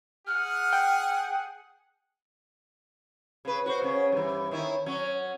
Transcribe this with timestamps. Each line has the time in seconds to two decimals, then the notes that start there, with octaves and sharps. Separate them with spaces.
0.27 G#4 F#5 F6
0.73 G5
3.45 C#3 B4
3.66 F#4 B4 C5
3.82 C#3 C#4
4.12 G2 E3
4.51 D#3 C#4 E4
4.86 F#3 C#4